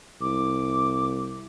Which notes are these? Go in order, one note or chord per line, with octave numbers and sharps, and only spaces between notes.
C2 D6